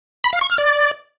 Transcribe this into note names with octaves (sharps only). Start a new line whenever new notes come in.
B5
F5
C#6
F6
D5